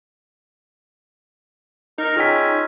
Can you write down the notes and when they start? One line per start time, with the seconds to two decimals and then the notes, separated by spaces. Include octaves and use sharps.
1.98 D#4 A#4 D#5
2.16 C#4 F4 G#4 D#5 G5 E6 B6